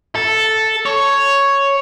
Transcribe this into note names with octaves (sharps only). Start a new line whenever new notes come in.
A4
C#5